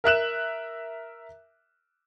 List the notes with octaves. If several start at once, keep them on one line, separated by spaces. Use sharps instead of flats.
A#4 E5 F#6 E7